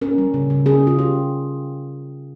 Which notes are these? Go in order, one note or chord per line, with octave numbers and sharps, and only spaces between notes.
C#4 A#4
G3
C#3
C#3
C#4 G#4
C#3 F4
C#3 G4